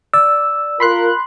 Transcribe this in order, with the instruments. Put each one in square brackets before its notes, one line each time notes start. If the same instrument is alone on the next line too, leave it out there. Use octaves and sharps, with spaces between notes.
[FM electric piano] D5 [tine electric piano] E6
[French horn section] F4 A#4 [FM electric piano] B5 C6 F#6